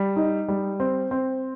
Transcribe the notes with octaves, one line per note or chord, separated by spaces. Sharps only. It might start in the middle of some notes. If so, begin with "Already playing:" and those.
Already playing: G3
D#4
G3
C4
C4